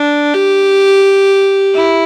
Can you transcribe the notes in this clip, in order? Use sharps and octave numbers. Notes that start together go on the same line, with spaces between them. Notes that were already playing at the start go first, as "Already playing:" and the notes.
Already playing: D4
G4
E4